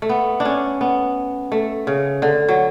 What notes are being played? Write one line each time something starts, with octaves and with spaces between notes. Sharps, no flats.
A3
B3
D4
C#4
B3
A3
C#3
D3
F#3